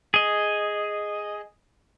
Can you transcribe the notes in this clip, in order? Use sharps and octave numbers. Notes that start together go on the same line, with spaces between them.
G#4 D#5